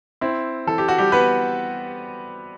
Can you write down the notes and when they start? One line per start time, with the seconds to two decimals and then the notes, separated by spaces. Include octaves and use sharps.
0.21 C4 E4
0.67 E3 A4
0.78 G4
0.88 F#4
0.98 G3 G4
1.12 G3 B3 B4